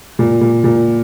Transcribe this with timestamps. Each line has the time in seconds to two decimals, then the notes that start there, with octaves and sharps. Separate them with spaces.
0.19 A#2
0.41 A#2
0.64 A#2